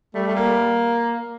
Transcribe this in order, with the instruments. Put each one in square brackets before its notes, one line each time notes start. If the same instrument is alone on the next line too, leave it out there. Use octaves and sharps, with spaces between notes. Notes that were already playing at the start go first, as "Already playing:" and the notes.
[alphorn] G3 [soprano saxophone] A3
[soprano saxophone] A3
A#3